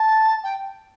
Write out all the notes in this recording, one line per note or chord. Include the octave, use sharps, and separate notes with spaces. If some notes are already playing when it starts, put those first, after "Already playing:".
Already playing: A5
G5